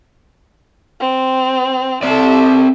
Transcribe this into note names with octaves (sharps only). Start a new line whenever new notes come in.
C4
C4 A4 D5 E5